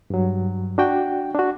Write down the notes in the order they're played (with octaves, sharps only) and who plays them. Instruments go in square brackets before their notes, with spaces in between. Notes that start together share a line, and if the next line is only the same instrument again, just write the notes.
[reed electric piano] G2 F#3
D4 F#4 G5
D4 F#4